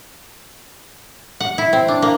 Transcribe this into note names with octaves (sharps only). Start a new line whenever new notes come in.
F#5
E4
C4
D4
A#3